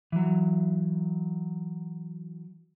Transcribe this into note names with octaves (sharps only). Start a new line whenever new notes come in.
E3 F#3